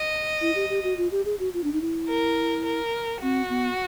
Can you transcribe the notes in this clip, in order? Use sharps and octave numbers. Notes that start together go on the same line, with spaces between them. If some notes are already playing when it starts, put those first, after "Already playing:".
Already playing: D#5
E4
G4
G4
F#4
F4
G4
G#4
F#4
F4
D4
D#4
E4
A#4
A#4
C4 F#4
B3